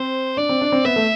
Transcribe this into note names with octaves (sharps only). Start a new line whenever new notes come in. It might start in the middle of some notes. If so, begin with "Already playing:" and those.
Already playing: C4 C5
D4 D5
C4
D4
C4
B3 E5
A3